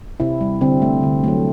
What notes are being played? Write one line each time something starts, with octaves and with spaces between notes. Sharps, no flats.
C3 C4 E4
G3
D3 C4
A3
D3
F#3 A3